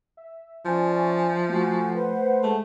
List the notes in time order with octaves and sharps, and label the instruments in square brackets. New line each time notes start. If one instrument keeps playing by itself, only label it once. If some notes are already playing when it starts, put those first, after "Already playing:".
[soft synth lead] E5
[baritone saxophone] F3 [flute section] C#4 D5 G#5
[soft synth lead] A3 [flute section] F#4 G5 G#5
[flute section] B4 C5 F#5
[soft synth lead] G#3 [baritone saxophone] A3